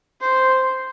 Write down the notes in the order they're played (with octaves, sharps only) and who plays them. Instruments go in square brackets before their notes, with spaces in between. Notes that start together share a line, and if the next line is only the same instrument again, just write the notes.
[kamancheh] C5